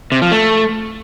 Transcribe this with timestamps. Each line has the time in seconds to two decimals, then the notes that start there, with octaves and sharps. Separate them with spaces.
0.12 C3
0.22 F3
0.32 A3